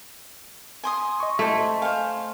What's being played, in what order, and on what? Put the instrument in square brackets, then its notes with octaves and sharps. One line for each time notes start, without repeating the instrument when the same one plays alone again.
[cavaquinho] G#5 C6 D#6
[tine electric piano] D#5 C#6
[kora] A3 [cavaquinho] E4 C5
[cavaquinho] C5 F5 [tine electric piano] G#5